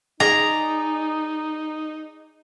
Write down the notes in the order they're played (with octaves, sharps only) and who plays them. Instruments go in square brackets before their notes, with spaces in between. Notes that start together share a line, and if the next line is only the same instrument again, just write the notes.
[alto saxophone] D#4 [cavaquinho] G#4 D5 D#5 [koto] A#5